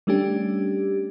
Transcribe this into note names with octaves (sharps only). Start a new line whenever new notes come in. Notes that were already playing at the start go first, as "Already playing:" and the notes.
G3 A3 C#4 D4 G4